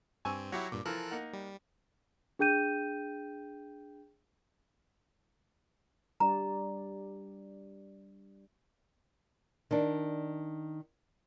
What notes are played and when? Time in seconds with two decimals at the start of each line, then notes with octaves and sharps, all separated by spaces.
0.25 G2 C4 G#5 C#6 E6
0.52 F#3 E4 F#4 G4 C#5 F#5
0.72 G2 A#2 D6
0.86 E3 F3 A4 A#4 F#6
1.11 A#3 D#4 F#5
1.33 G3
2.39 D4 G#4 G5 G6 D#7
6.20 G3 D4 D5 A#5
9.71 D#3 D4